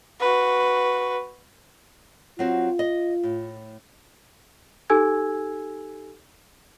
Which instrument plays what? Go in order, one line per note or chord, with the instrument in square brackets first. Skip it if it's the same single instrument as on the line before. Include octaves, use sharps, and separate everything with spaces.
[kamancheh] F#4 B4
[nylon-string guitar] F#3 C4 F#4 [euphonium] F4
[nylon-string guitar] D#5
A2
[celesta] D#4 G4 A4 G#5 E6 G#6